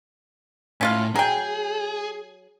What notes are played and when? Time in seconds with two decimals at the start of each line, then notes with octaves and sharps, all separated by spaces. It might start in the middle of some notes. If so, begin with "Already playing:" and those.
0.81 A2 C#4 F4 F5
1.16 F#3 G#4 G5